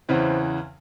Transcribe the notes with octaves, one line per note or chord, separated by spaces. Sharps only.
E2 C#3 E3 C4